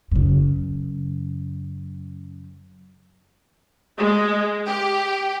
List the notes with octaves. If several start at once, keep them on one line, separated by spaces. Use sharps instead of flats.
F#2 C#3
G#3
G4